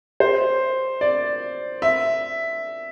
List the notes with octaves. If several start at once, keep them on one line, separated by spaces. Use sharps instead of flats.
C5
D5
E5